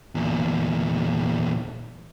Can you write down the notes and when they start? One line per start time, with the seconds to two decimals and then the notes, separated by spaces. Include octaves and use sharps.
0.15 E2 A#2